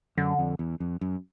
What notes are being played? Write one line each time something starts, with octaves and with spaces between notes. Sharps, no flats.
F#2 D3
F2
E2
F2
F#2